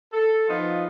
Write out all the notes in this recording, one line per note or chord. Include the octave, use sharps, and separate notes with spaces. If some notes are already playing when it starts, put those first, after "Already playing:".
A4
F3 B3 D#4 F4